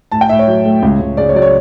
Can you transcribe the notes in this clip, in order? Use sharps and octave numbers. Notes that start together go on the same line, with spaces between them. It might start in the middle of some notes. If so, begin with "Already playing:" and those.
A2 A5
G5
A2 E5
C#5
F#3
A3
C#2
C#2
C#3 D5
C#5
F#3 D5
C#5